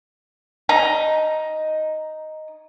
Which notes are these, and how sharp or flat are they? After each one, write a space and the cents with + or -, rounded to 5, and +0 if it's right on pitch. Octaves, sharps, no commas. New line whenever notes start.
D#4 +0 A#5 +15